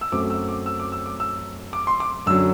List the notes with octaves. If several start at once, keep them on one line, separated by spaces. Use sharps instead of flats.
E6
F#2 F#3 A3 C4 D6
E6
D6
E6
D6
E6
D6
E6
D6
C6
D6
F#2 D3 F#3 E6